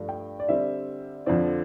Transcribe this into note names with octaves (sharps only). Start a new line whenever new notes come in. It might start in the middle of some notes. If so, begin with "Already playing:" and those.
Already playing: G2 F3 A3 D4
G5
D5
D3 G3 C4 E5
F2 D3 F3 C4 D5